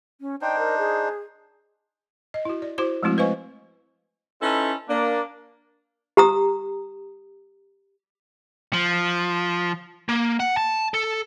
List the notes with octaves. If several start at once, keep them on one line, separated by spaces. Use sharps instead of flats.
C#4
D4 D#4 C5 G5
A#4
G#4
D#5
E4 F#4
D5
E4 F#4 C5 D6
F3 G#3 A3 C4 E4 F#4
B4 C5 D#5 F5 G#5 C#6
C#4 D#4 E4 A4 B4 C5
A#3 D4
G4 A#5 D#6
F3
A#3
F#5
A5
A4